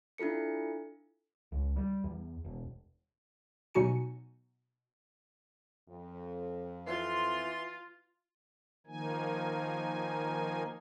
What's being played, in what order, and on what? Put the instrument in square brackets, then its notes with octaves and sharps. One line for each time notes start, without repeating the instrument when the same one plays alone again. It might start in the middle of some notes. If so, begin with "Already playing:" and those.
[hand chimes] D4 E4 F4 A4 C#7
[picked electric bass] C#2
G3
E2
E1
[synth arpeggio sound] B2 F#3 D#4 F#4 G#5 C#7
[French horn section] F2
[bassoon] E3 [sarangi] F4 [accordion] C6
[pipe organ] D#3 F3 A#3 D#4 G#5